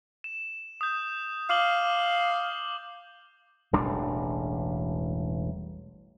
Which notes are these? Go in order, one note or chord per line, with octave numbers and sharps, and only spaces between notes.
E7
D#6 G6
F5 D6 F#7 G7
E1 A1 G3 D4